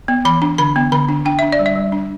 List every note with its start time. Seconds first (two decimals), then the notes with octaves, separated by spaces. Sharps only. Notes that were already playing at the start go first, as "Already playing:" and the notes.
0.08 B3
0.25 E3 B5
0.42 D4
0.58 D3 B5
0.76 B3
0.92 D3 B5
1.09 D4
1.25 D4 G5
1.39 D4 E5
1.52 D5
1.59 G3
1.66 E5
1.76 G3
1.92 D4